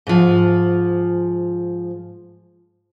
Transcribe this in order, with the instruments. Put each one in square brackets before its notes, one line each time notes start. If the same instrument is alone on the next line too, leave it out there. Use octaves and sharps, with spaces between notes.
[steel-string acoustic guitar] G#2 F3